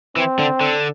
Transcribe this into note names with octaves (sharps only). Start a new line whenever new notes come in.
E3 C4
D3
D3